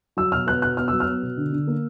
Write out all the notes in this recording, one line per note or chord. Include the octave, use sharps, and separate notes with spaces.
F#3 E6
B2 F6
B3 F#6
B2 F#6
B3 F6
F#3 E6
F6
B3
B2
D3
D3
A#3